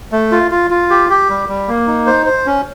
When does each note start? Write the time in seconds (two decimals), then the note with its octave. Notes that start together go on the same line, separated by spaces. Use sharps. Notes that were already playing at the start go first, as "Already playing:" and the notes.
0.12 A3
0.32 F4
0.51 F4
0.70 F4
0.90 G4
1.10 G4
1.29 G3
1.48 G3
1.68 A#3
1.87 D#4
2.07 C5
2.26 C5
2.46 C#4